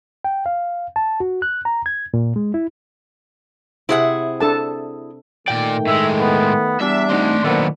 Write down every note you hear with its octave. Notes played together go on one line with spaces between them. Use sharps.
G5
F5
A5
F#4
F#6
A#5
G#6
A#2
G#3
E4
C3 C4 E4 G#4 F#5
D4 A4 A5
A#2 D#3 A3 D5 G5
A2 G#3 E5
B3
E2 G3 D4 E5
A3 C4 D#4 F#5 C6
A#2 D#3 F#3 A3 B3 C5